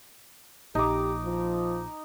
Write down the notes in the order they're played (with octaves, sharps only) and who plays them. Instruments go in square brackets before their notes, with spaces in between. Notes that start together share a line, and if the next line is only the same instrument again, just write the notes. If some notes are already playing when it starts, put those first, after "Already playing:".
[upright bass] A#1 [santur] D#4 D6 [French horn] G4
[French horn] F3